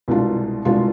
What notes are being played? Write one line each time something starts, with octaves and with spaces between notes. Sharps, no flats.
C2 B2 G#3 D4 F4
C2 B2 G#3 D4 F4